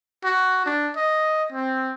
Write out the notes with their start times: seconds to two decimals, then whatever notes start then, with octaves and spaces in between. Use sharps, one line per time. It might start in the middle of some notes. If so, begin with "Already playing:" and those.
0.24 F#4
0.66 D4
0.96 D#5
1.52 C4